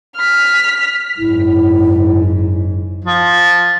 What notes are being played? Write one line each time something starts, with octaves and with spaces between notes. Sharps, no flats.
F6 B6
F#1 G#2 E4
F3